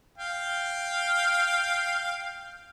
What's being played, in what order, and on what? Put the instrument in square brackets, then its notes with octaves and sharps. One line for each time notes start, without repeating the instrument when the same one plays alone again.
[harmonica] F5 G5